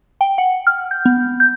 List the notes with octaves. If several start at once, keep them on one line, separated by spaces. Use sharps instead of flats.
G5
F#5
F6
G6
B3
G6